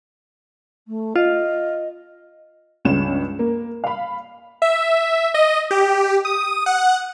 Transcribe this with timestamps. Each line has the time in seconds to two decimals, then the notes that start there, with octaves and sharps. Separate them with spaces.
0.87 A3
1.16 F4 D#5
2.85 C#2 G2 G#3 C#4 E7
3.39 A#3
3.84 F5 B5
4.62 E5
5.34 D#5
5.71 G4
6.25 D#6
6.66 F#5